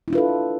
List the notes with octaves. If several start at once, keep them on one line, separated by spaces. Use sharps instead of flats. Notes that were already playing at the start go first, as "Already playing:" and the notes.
D4 E4 F4 A4 B4